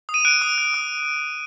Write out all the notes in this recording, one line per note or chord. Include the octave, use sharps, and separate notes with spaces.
D#6
D#7
F#6 D7
D#6
F#6
D#6